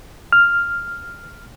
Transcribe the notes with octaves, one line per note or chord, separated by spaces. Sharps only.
F6